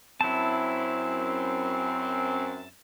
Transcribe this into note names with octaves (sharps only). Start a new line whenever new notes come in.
F#2 C4 E4 A5